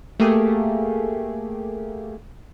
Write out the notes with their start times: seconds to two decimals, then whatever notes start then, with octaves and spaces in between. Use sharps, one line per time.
0.19 A3 A#3 G4 G#4